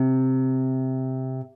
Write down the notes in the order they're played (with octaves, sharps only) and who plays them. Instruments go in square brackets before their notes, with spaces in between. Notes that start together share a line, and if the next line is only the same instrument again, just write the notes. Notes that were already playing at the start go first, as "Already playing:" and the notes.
Already playing: [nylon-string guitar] C3